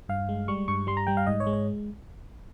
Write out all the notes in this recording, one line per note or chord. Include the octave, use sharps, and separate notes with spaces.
G2 F5
G#3
G3 C#6
G2 C#6
G3 C6
A#5
G3 G5
F5
G#2 D#5
C#5
G#3
C#5